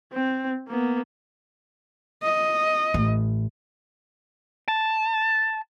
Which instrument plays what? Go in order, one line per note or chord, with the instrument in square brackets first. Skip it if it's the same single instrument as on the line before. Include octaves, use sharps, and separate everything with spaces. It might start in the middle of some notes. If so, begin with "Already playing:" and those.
[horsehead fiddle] C4
A#3 B3
D#5
[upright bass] A1
[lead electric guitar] A5